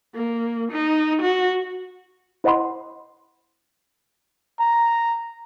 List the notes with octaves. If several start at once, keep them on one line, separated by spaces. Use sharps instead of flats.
A#3
D#4
F#4
E4 C5 D#5 F#5 B5 C6
A#5